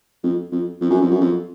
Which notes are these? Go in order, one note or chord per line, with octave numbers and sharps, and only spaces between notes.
F2
F2
F2
F#2
F2
F#2
F2